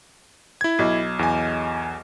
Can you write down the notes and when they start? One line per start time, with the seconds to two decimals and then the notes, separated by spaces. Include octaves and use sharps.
0.61 E4 G#6
0.79 B1
1.19 E2 G#5